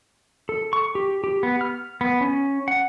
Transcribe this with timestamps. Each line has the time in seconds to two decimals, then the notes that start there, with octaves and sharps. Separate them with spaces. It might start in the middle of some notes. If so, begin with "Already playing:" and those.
0.49 A4
0.73 C#6
0.95 G4
1.24 G4
1.43 B3
1.61 F6
2.01 B3
2.21 C#4
2.68 F#5